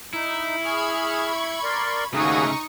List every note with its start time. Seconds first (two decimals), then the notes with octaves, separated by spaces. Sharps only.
0.13 D#4 E4
0.64 G#4 B5 C#6 F6 G#6
1.64 A#4 D5 C6
2.14 D#2 C#3 A3 D#4 F#4 G#4 C#6 D#6